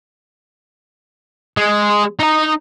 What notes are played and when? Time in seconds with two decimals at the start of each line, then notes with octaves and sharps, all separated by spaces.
1.57 G#3 G#4
2.19 D#4 A#5